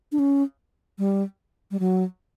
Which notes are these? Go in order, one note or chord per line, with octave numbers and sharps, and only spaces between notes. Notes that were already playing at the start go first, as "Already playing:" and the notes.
D4
C#4
G3
G3
F#3